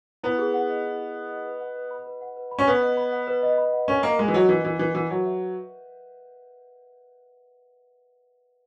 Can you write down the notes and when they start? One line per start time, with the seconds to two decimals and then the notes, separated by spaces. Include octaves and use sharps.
0.24 B3 E4
0.38 G#4
0.54 F#5
0.69 D#5
0.84 E4
1.00 G#4
1.15 F#5
1.30 D#5
1.45 B4
1.60 F#5
1.76 B4
1.91 B5
2.06 B4
2.21 F#5
2.36 B4
2.51 B5
2.59 C#4
2.67 B3 B4
2.82 D#5
2.97 B5
3.12 F#5
3.28 B4
3.43 D#5
3.58 B5
3.73 F#5
3.88 C#4 A#4
4.03 A#3 D#5
4.18 G#3 A#4
4.28 E3
4.34 F#3 F#5
4.49 E3 A#4
4.64 E3 D#5
4.79 E3 A#4
4.95 E3 F#5
5.10 F#3 B4
5.25 E5